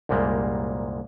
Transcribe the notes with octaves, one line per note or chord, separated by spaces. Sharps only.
C2 F#2 A#2 G3 G#3 A#3